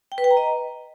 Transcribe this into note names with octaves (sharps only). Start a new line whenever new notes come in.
G5
B4
G5
A#5
D#5